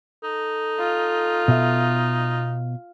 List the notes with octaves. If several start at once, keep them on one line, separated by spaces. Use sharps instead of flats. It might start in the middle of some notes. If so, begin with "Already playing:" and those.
D#4 A4
F4
B2 E5